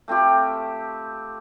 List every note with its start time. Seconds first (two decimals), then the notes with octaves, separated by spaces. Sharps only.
0.08 A3 C4 F4 G4